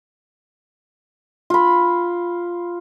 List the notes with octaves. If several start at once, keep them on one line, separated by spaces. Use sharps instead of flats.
F4 B5